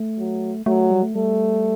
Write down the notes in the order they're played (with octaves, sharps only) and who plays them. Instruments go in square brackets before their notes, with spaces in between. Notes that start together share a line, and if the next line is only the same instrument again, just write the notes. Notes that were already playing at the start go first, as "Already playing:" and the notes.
Already playing: [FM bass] A3
[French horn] F#3
[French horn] F#3 [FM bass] A3
[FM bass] G3
A3
[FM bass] G3 [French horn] A3